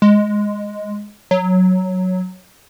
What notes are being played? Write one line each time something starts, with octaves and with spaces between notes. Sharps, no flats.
G#3
F#3